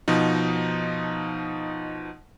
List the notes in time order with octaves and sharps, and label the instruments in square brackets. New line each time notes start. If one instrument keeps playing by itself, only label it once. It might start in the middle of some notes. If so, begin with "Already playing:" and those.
[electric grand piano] B2 F3 D#4